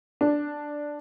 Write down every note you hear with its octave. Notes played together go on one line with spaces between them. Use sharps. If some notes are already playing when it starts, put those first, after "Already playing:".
D4